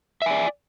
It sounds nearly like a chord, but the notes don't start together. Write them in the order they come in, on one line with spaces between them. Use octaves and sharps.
E5 G#5 D5